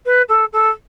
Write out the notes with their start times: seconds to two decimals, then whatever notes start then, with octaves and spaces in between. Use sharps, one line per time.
0.06 B4
0.29 A4
0.53 A4